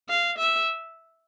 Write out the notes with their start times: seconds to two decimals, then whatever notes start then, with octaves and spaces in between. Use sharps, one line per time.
0.09 F5
0.38 E5